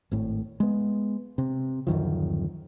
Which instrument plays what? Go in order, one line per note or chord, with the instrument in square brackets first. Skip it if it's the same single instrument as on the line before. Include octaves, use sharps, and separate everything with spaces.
[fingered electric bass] G#1 A2
G#3 B3
C3
D1 F#2 D#3 F3